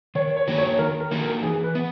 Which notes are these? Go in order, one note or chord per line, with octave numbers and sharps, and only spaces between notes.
D#3 C#5
C#5
A#3 D#4 F#4
C#5
D#3 A#4
A#4
A#3 D#4 F#4
A#4
E3 G#4
B4
B3